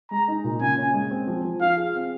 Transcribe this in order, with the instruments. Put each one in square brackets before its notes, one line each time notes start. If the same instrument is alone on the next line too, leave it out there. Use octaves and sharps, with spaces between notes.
[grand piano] G#3 [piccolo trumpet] A#5
[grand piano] D#4
A#2
[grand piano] C#3 [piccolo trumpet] G#5
[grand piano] C#4
G#3
C4
F3
F3
[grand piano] F4 [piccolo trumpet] F5
[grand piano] G#4
C4